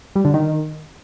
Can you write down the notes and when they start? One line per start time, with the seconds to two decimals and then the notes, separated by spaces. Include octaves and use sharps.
0.16 G3
0.25 D3
0.34 D#3